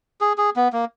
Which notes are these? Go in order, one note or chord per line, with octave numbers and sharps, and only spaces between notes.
G#4
G#4
B3
A#3